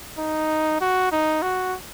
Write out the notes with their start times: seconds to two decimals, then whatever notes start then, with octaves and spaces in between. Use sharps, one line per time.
0.19 D#4
0.81 F#4
1.12 D#4
1.42 F#4